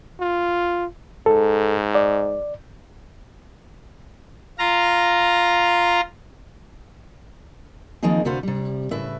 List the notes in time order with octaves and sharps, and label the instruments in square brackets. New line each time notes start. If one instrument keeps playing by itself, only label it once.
[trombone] F4
[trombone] G#2 [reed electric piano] A4
[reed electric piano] D5
[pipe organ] F4 A#5
[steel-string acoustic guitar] D#3 F3 A#3 C4 D#4 G#4
D2 C3 F#4 B4 C5 F5
C3 G3
A2 C#3 B4 E5